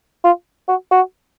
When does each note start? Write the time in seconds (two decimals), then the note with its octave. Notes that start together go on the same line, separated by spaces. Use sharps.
0.24 F4
0.68 F#4
0.91 F#4